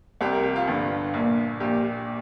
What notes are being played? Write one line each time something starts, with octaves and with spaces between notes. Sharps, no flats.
C2 C3 G4
A#4
G4
F4
G1 G2 D3
A#1 A#2
A#1 A#2 G4
G4